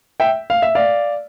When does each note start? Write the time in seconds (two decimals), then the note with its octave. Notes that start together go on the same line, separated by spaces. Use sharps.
0.20 E5 G5
0.50 F5
0.62 E5
0.75 D5 F5